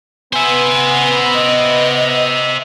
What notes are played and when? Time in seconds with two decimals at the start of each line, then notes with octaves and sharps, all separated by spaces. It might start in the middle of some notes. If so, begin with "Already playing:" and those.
0.33 B3 C5 E5 G#5
1.34 D#5